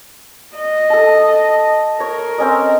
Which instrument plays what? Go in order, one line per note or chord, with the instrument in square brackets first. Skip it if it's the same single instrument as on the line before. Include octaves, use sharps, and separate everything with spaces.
[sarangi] D#5
[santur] A4 A5
[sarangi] A#4 [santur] C#5
[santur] C4 C#4 D#5